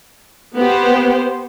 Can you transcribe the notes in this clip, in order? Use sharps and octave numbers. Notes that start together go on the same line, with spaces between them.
B3 G4 C5